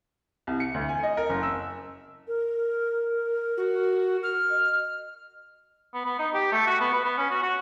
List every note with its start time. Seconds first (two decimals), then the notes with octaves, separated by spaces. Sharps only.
0.47 C2
0.60 C#7
0.74 D2
0.89 G#5
1.03 D#5
1.17 A#4
1.30 F#1
1.43 E6
2.28 A#4
3.57 F#4
4.23 F6
4.50 D#5
5.94 B3
6.05 B3
6.19 D#4
6.34 G4
6.52 A3
6.67 F#4
6.81 B3
6.93 B4
7.05 B3
7.18 C#4
7.31 F#4
7.42 F#4